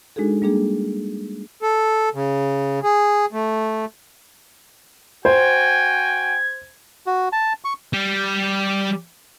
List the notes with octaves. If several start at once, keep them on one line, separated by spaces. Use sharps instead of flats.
G#3 D4 D#4 F#4 G#4 A4
G3 A#3 D4 G#4
A4
C#3
G#4
A3
F#4 C5 G5 G#5 G#6
F#4
A5
C#6
G3 G4